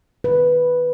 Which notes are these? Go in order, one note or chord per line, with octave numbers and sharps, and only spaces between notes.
D#3 B4